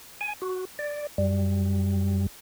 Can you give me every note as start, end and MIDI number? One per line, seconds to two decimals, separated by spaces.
0.21 0.34 80
0.42 0.65 66
0.79 1.07 74
1.18 2.26 42
1.18 2.26 55